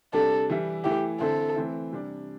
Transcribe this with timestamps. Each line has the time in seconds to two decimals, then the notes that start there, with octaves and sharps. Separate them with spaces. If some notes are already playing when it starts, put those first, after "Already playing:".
0.13 C3 G3 D4 A4
0.50 E3 G3 E4
0.85 E3 A3 E4 G4
1.20 D3 C4 E4 A4
1.56 E3 A3 C4 E4
1.92 C3 G3 D4